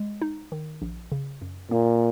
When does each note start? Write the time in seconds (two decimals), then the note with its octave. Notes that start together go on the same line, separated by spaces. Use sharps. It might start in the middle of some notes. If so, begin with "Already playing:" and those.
Already playing: G#3
0.22 D#4
0.52 D#3
0.82 A#1
1.12 C#3
1.41 F#2
1.71 A#2 A#3